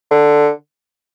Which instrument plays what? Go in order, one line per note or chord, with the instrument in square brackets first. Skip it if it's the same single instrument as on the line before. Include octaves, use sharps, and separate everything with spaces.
[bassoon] D3